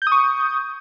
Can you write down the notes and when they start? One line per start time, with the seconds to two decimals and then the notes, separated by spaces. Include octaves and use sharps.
0.02 G6
0.07 D#6
0.12 C#6